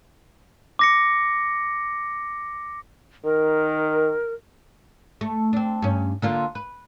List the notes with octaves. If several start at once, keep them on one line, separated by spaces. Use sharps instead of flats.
D6 A#6 C#7
D#3 A#4
A3
C4 D4
G2 C#4
D3 A#3 F4
B4